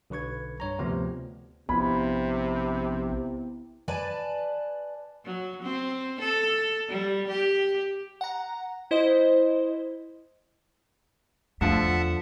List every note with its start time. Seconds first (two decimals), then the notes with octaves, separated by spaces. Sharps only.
0.10 B1 D3 B4 C#6 G#6
0.60 G2 C#5 A#5
0.78 D2 C3 F3 B3
1.69 A#1 C3 B3 E4 B5
3.88 B4 D5 G#5 A5
5.25 F#3
5.63 C4
6.21 A4
6.89 G3
7.28 G4
8.21 F#5 A#5
8.91 E4 C5 D#5
11.61 E2 D3 F3 A3 E5 F#5 A5